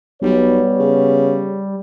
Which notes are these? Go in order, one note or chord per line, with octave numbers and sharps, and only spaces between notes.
B1 G3 B3 C#5
C#3